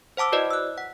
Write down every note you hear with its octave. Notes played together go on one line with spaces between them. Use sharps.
C5 F#5 A5 D6 E6
E4 F#4 B4 C5 D5 D#5
E6 F#6
F#5